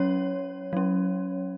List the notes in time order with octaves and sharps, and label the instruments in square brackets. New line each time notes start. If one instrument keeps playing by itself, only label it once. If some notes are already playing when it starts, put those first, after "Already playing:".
Already playing: [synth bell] F#3 C#4 C#5
F#3 C#4